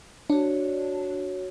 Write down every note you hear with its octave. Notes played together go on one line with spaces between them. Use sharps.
D4 F#4 C#5